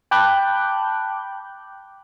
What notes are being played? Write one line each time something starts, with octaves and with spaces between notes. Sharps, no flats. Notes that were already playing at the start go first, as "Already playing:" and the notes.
G5 A5 B5 D6 F#6 G6